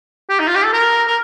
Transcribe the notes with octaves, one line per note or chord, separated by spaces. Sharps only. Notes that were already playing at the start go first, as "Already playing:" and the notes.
G4
D#4
F4
G4
A4
A#4
A#4